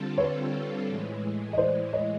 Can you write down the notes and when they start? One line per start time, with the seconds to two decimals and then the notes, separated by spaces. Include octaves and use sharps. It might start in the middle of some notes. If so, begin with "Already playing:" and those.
Already playing: D3 G3 C4 F4 A4
0.18 B4 C#5
0.88 A2 E3 G#3
1.53 D#5
1.58 C5 D5
1.93 C#5 D#5